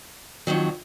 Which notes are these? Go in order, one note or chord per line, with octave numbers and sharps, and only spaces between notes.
F2 D#3 F#3